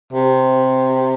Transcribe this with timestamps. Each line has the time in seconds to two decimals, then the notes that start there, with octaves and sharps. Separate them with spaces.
0.13 C3